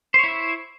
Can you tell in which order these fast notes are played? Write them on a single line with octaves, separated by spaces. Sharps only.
C5 C#5 E4 E5